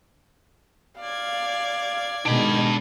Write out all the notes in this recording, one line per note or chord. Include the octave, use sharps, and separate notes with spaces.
D5 F5 G#6
B2 D#3 G#3 D4 B5